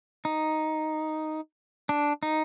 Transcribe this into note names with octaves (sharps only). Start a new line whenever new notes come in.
D#4
D4
D#4